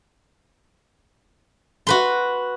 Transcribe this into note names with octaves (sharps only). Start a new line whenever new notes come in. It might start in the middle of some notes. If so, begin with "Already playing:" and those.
F#4 B4 C6